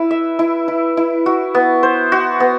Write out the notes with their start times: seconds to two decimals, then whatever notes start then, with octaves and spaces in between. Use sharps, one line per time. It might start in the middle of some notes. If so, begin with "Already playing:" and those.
Already playing: E4 B4
0.11 E5
0.39 E4
0.68 E4
0.97 E4
1.26 F#4
1.55 B3
1.83 C5
2.12 F#4
2.40 B3